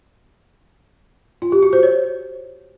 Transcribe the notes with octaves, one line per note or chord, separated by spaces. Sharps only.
F4
G4
F#4
C5
C#5